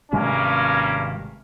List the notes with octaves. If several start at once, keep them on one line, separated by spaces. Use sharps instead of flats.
G#1 G2 C3 G#3 A#3 C#4